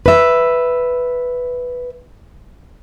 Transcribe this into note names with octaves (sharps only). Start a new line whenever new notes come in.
B4 E5